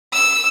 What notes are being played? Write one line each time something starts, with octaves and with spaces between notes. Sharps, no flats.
E6